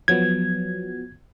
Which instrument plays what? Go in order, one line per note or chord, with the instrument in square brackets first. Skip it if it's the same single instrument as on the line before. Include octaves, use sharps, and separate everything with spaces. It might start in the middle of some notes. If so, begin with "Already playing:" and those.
[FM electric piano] F3 F#3 B3 [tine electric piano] G#6